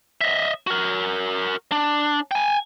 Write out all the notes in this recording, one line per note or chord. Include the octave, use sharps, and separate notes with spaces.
D#5 E5
F#4 A#4
D4
G5 G#5